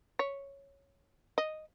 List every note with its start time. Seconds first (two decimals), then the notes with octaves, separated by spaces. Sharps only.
0.19 C#5
1.38 D#5